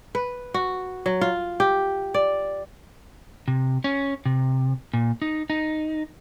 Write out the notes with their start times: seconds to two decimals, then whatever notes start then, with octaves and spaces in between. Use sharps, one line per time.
0.15 B4
0.54 F#4
1.06 F#3
1.21 F4
1.60 G4
2.14 D5
3.48 C3
3.84 C#4
4.25 C3
4.94 A#2
5.22 D#4
5.50 D#4